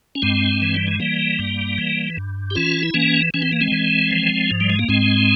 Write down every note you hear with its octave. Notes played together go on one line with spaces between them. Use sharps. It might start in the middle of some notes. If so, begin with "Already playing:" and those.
C#4
G2 G#3 C4
E3
G3
G#3
E3 G3 A#3
G2
E3
G2
G4
E3 C#4 F4
E4
E3 A#3 C#4
E3 C#4
C4
A#3
G#3 C4
E3
F3
G#2
G3
G#3
A#3
G#2 G#3 C4